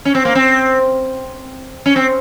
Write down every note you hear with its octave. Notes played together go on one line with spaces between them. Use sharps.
C#4
C4
A#3
C4
C#4
C4